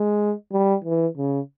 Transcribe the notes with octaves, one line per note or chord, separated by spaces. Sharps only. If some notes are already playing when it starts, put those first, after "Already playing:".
Already playing: G#3
G3
E3
C#3